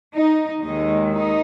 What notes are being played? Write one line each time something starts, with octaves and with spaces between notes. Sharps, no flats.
D#4
D#2 D#3 G#3 D#4
D#4